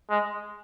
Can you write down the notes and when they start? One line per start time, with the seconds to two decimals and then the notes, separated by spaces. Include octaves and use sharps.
0.10 G#3